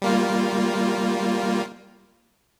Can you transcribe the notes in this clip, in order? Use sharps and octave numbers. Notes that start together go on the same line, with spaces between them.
G3 A#3 F4